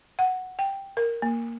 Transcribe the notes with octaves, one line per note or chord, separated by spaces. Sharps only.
F#5
G5
A#4
A#3